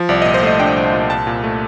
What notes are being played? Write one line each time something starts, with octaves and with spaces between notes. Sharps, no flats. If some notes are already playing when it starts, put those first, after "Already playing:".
Already playing: F3
C2 D5
D#5
A#2
C5
A3 D#5
D4 G5
C2
A#2
C2 A5
A#2
A3